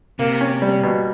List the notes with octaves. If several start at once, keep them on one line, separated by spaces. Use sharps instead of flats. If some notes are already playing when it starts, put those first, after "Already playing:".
C3 A#3
C#4
G3
B2